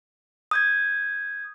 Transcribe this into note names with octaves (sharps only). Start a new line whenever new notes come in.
D#6 G6 G#6